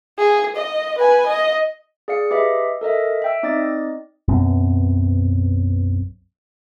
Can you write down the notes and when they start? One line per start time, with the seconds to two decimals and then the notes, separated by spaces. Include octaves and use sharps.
0.18 G#4
0.56 D#5
0.99 B4 G#5
1.27 D#5
2.08 G#4 D5 F5 C#7
2.31 G4 B4 D#5 E5
2.81 A4 A#4 D#5 E5
3.22 E5 G5 E6
3.43 C4 D#4 D5 D#5 A6
4.28 B1 F#2 B2 C4